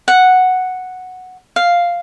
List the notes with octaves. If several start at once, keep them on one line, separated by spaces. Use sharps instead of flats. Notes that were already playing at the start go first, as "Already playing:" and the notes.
F#5
F5